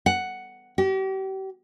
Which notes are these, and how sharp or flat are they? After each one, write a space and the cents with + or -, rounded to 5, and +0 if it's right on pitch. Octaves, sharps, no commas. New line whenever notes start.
F#5 +5
G4 -40